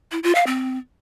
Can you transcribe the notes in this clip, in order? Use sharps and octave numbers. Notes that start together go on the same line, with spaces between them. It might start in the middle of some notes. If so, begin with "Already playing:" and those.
E4
F4
F5
C4